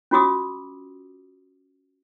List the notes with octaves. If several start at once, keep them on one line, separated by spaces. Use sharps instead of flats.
C#4 F4 F#4 D6 D#6